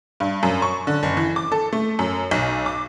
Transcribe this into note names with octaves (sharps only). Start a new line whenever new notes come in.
G2
F#2
C#6
D3
F#1
E3
D6
A4
A3
F#2
B1
D6